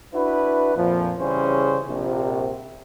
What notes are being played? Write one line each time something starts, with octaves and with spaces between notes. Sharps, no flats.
D4 E4 F#4 B4
F2 A#2 F3
C#3 E3 G3 C#4 G#4 C5
A#1 C3